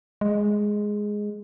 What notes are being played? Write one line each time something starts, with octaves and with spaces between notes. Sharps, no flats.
G#3